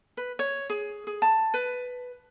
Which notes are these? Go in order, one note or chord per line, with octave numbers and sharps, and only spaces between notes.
B4
C#5
G#4
G#4
A5
B4